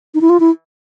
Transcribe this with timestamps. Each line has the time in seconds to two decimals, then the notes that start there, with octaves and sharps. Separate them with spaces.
0.14 D#4
0.21 E4
0.30 F4
0.40 E4